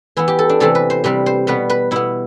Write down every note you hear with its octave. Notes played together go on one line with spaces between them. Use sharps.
E3 B3 E4
G4
A4
D4
C3 E3 A3 C4 A4
B4
C5
C3 G3 C4 B4
C5
B2 G3 B3 B4
B4
B2 B3 E4